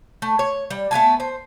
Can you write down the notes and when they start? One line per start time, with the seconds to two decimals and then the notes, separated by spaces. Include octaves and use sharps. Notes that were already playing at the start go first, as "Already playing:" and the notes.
0.22 A3
0.39 C#5
0.70 G3
0.91 A3 B3 G#5 A5
1.20 C5